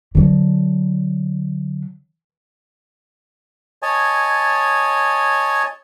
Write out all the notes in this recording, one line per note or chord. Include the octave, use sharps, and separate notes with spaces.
D3 F#3
C#5 D#5 G#5 A5